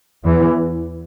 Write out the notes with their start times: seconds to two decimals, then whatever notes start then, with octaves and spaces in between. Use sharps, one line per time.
0.24 E2 E3